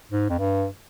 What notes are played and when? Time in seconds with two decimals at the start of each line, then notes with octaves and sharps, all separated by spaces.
0.11 G#2
0.29 F2
0.39 G2